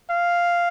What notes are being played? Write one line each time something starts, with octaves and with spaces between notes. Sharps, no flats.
F5